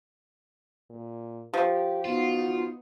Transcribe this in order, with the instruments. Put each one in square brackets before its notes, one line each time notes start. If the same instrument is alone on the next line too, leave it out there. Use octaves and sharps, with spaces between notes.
[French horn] A#2
[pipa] F3 [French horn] G4
[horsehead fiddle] B3 D#4 [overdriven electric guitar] F4 [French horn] F#4